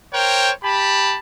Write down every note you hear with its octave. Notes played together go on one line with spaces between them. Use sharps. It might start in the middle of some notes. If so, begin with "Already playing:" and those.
A#4 C5 C#5 G5
G4 A5 B5